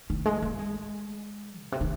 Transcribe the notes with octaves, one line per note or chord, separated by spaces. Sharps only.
D#3
G#3
A#3
G#3
A#2
C3
D#3